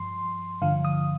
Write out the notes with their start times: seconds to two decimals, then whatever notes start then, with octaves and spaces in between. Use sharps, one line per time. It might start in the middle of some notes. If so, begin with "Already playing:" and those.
Already playing: G2 F3 C6
0.62 G2 D3 F3 F5
0.85 D#6